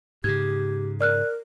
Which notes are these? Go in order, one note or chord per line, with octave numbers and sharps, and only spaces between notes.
G#2 C#3 G4 G#6
A#4 D5 F6 F#6